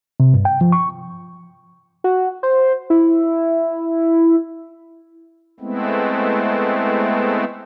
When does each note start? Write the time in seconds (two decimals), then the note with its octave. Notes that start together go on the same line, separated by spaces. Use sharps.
0.20 C3
0.34 G2
0.45 G5
0.61 F3
0.72 C#6
2.04 F#4
2.43 C5
2.90 E4
5.60 G#3 A3 B3 C4 E4